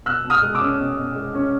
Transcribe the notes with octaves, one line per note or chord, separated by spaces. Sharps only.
B2 E6 F#6
B2
D#6 F6
G#3
D6 E6
C#4
B2
B2
G#3
C#4